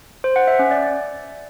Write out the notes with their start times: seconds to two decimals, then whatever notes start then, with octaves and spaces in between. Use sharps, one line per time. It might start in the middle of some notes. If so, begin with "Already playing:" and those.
0.24 C5
0.36 F#5
0.48 E5
0.59 C#4
0.71 D5